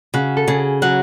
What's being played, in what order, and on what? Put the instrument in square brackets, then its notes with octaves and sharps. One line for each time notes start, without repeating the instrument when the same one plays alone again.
[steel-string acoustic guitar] C#3 [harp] F#4
[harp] A4
[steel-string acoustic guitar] C#3 [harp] G#4
[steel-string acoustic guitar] F#3 [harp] F#5